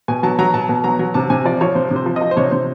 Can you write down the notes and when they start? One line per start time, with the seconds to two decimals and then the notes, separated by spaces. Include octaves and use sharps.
0.08 B2 G#5
0.23 F#3 A5
0.39 F#3 A#5
0.54 B2 A5
0.69 B2
0.84 F#3 A#5
0.99 F#3
1.14 C3 A5
1.30 C3 G#5
1.45 F3 D5
1.61 F3 C#5
1.75 C3 C5
1.91 C3 C5
2.06 F3
2.16 D#5
2.21 F3
2.31 C5
2.37 C3 C#5
2.51 C3 C5